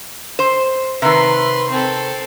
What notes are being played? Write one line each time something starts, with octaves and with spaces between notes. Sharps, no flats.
C5
C3 D#3 B4 C6
C4 A4